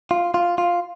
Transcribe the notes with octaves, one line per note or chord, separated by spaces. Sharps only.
F4
F4
F4